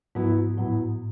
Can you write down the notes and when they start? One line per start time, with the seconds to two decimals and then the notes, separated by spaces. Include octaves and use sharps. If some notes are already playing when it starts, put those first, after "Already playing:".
0.15 G#2 F#3 B3 E4
0.57 A2 F#3 B3 E4